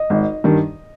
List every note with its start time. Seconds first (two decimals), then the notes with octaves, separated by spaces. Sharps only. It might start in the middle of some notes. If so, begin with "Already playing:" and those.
Already playing: D#5
0.10 G#1
0.44 G2 D#3